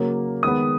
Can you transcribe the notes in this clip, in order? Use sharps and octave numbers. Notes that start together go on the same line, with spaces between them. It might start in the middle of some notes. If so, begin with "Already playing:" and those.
Already playing: C#3 F#3 A#3
D#3 G#3 B3 D#6